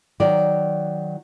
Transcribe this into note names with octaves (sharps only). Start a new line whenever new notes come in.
D#3 F#3 D5